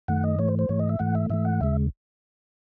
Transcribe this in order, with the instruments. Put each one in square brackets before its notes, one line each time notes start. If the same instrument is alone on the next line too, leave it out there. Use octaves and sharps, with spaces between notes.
[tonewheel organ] F#2 D#3 A3 F#5
D#5
G#2 E3 A3 C#5
C5
C5
G#2 E3 A3 C#5
D#5
E5
G#2 E3 A3 F#5
E5
G#2 E3 A3 E5
F#5
D#2 C#3 G#3 E5